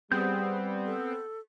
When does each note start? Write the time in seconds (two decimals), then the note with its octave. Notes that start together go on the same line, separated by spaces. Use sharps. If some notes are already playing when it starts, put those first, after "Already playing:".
0.12 G3 B3 C4 G#4 F#5 G6
0.86 A4